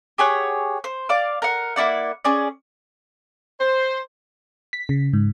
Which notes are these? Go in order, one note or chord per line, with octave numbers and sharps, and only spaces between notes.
G4 G#4 C#5 F#5
C5
D5 F5 D6
A#4 F#5
A#3 E4 D5 F#5
C#4 G#4 D5
C5
B6
C#3
G#2